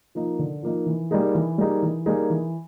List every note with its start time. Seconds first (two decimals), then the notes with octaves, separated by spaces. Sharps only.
0.15 F3 A#3 D#4
0.39 D3
0.63 F3 A#3 D#4
0.86 E3
1.11 G3 A#3 D#4 G#4
1.35 E3
1.58 G3 A#3 D#4 G#4
1.82 E3
2.06 G3 A#3 D#4 G#4
2.30 E3